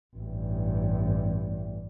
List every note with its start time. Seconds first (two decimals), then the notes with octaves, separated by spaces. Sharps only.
0.16 A1 G2